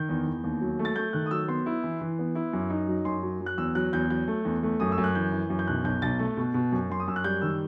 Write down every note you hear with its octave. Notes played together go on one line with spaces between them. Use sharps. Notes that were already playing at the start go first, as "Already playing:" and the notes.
Already playing: D#3 G6
E2
E2
D#2
F#3
A3
A6
A3 G6
D#3 F#6
D#6
F#3 E6
B3 C6
E4
E3
E3
B3
E4
F#2
D#4
F#3
F#2 C6
F#3
F#3
F#6
E2 E6
F#3 F#6
E2 G6
F#3 G6
A3
E2
A3
F#2 D#6
E6
F#2
F#6
E3 G6
E3
F#2
G6
B1 F#6
B1 G6
B1 A6
A3
B2
B2
F#2
F#2 C6
D#6
F#2 E6
F#6
G3 G6
D#3 E6